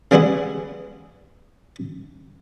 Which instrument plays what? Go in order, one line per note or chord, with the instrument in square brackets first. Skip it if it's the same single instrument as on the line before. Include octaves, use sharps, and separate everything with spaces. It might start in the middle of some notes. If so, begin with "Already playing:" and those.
[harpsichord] C#3 E3 G3 G#3 B3 E4